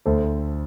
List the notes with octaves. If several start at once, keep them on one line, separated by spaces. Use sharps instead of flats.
D2 A4 C5